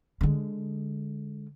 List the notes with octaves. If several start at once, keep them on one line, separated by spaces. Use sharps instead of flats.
D3 G#3